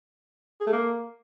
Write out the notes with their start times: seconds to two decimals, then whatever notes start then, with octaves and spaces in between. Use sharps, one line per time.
0.60 G#4
0.66 A3
0.72 A#3